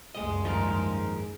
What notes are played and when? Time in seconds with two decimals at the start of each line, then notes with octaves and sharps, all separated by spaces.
0.15 F#1 C#2 G2 G#3 G#4 D#5
0.45 D#2 G#2 F3 A#3 D#4 A#4